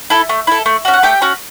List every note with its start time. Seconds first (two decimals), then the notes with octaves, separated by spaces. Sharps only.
0.10 E4 A4
0.29 A3
0.47 E4 A4
0.66 A3
0.85 C#4 F#4
0.94 F#5
1.03 A3 G4 G5
1.22 C#4 F#4